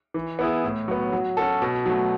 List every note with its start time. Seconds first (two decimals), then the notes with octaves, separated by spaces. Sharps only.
0.14 E3
0.39 B3 E4 G#4
0.64 A2
0.88 F#3 B3
1.13 F#3
1.37 C#4 F#4 A4
1.62 B2
1.86 F#3 A3